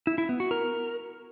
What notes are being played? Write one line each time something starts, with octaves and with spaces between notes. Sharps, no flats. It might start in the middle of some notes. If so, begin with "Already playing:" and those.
E4
E4
B3
F#4
A#4